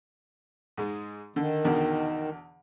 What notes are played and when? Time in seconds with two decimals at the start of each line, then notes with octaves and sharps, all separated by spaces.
0.77 G#2 G#3
1.36 D3 D#3
1.65 E2 B2 D3